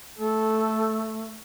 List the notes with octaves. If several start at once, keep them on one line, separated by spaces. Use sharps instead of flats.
A3 A4